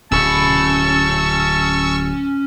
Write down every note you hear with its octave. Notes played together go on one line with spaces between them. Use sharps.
D1 C#4 A5 B5 C#6 E6